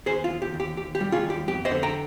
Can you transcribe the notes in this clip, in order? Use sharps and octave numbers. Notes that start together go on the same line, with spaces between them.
D#2 G#4 C5
F4
D#2
G4
D#2
G4
D#2 G4
G4
G3
F4 G#4
D#2
G4
F2 G4
C5 D#5
D3
G5 A#5